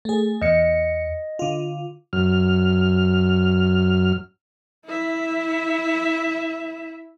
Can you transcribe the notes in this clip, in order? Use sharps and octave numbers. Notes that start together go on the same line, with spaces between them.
A3 G#4
E2 D#5 C#7
D3 F4
F#2 F6
E4 E5